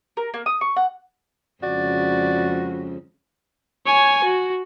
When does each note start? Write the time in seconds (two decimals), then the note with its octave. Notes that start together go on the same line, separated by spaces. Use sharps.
0.17 A#4
0.34 A#3
0.46 D#6
0.61 C#6
0.76 F#5
1.63 F2 C#3 G#3 F#4 D5
3.86 C#5 G#5
4.24 F#4